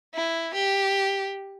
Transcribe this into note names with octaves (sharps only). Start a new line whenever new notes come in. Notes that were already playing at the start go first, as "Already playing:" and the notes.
E4
G4